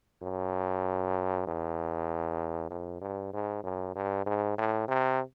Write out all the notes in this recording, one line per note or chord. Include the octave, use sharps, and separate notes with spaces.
F#2
E2
F2
G2
G#2
F#2
G2
G#2
A2
C3